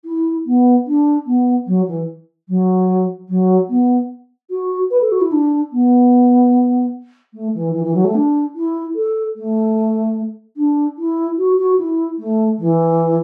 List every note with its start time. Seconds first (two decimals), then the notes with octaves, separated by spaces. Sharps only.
0.05 E4
0.46 B3
0.87 D4
1.26 B3
1.67 F#3
1.88 E3
2.48 F#3
3.29 F#3
3.69 B3
4.50 F#4
4.90 B4
5.01 A4
5.11 F#4
5.21 E4
5.31 D4
5.72 B3
7.33 A3
7.54 E3
7.73 E3
7.84 E3
7.94 F#3
8.04 A3
8.14 D4
8.55 E4
8.95 A4
9.36 A3
10.57 D4
10.98 E4
11.38 F#4
11.58 F#4
11.78 E4
12.19 A3
12.59 E3